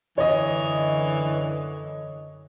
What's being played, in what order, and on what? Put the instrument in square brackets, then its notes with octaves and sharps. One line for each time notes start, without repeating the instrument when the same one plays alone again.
[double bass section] F#2 D3 [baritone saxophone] E3 [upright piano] C#5 D#5